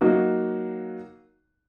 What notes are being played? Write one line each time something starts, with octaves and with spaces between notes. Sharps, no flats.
F#3 A#3 D#4 F#4